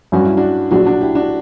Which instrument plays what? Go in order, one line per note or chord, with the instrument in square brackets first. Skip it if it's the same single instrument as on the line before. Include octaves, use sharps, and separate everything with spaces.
[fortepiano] G2 F#3 C#4 [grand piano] F#4
[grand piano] E4
D4 F#4
[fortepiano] A#1 A#2 F#3 [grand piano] D4 F#4
[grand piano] D4 F#4
E4 G4
D4 F#4